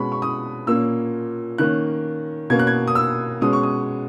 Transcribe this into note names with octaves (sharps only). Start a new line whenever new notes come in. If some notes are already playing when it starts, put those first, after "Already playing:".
Already playing: B2 G#3 C#4 B5 C#6
C#6
D#6
A#2 A#3 C#4 E6
D#3 A#3 C#4 F#6
B2 A#3 C#4 G#6
F#6
G#6
D#6
E6
B2 G#3 C#4 D#6
C#6
D#6